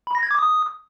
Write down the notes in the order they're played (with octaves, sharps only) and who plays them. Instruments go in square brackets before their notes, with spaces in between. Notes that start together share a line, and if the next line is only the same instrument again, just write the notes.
[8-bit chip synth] B5
A#6
G#6
D6
D#6